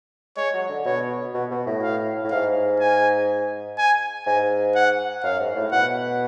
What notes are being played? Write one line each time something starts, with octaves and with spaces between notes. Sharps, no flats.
G#3 C#5
F#3
D3
B2 C#5
B2
B2
A2
F5
A2
G#2 F5
G#5
G#5
G#2 G#5
F#5
F#2 F5
G#2
A2
B2 F#5